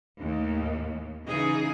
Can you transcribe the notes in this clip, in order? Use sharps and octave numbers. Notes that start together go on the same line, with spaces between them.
D#2 A2
C#3 E3 D#4 G#4